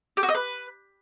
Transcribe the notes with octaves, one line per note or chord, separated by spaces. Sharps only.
G4
F#4
D#5
B4